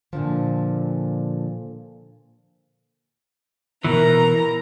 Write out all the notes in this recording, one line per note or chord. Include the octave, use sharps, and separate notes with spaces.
A#2 D3 F3
B2 E3 A#4 A#5